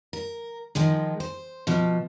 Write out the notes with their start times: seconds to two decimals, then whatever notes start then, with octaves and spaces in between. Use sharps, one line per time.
0.13 A#4
0.75 D#3 F3 G#3
1.20 C5
1.67 B2 F3